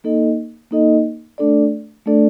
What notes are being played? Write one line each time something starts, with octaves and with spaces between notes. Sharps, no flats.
A#3 D#4 A4 D#5
A#3 D#4 A4 D#5
A3 D4 A4 D5
A3 D4 A4 D5